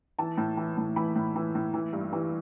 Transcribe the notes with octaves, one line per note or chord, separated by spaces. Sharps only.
E3 A5
A2
E3
A2
E3 B5
A2
E3
A2
E3
G2
E3